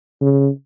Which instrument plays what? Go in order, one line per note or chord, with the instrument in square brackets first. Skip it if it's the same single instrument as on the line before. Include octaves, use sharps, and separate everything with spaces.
[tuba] C#3